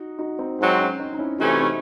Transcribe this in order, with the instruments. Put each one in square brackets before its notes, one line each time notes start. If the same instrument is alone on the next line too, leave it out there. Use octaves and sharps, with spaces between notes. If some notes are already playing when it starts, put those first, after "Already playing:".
Already playing: [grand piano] D#4 F#4
D#4 F#4
C4 D#4
[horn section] G#2 F#3 C4
[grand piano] C#4
C4 D#4
D#4
C#4 E4
[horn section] C3 E3 A3 C#4 [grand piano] D#4 F#4
[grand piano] C4 D#4